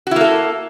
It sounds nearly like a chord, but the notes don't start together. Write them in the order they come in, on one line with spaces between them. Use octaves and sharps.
F#4 E4 A#3 A4